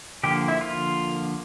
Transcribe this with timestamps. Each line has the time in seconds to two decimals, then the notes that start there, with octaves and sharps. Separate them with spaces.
0.23 D3 F3 A#3 G4
0.48 E4
0.61 F4